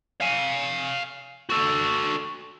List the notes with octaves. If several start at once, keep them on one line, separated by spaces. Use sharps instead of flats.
F5 G#5
F#4 A4